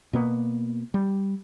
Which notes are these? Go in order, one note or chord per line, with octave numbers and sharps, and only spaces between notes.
B2 A#3 B3
G3